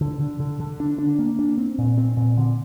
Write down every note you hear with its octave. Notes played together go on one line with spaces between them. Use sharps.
D3
D3
D3
D3
D4
D4
A#3
D4
C4
A#2
C4
A#2
D3